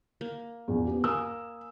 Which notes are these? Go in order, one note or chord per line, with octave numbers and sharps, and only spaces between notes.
A#3
A#1 E2
B3 G4
A#3 G#5 D#6 E6